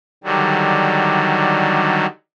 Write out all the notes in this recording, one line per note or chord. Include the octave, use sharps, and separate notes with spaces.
D3 D#3 F#3 G3